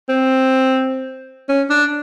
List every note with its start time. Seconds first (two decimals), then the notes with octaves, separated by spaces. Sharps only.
0.09 C4
1.49 C#4
1.70 D4